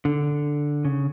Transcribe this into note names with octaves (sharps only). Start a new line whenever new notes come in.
D3
C#3